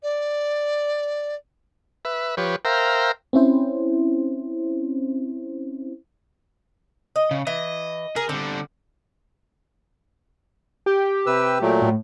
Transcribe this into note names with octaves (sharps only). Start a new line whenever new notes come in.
D5
B4 E5
F3 G4 B4 C#5
A#4 C5 E5 F5 G5 A#5
C4 C#4 E4 C5
D#5
C#3
E3 D#5
G#4 A#4
D3 G3 C4
G4
C3 B4 E6
A#2 F#3 A3
A2